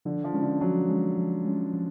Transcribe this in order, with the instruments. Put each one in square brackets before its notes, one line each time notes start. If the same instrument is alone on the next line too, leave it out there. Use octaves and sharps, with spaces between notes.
[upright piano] D3 [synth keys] F3
[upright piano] F3
[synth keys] G#3 C#4
[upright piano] D3
[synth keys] F3 [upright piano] F#3
[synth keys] G#3 C#4
F3
G#3 C#4
F3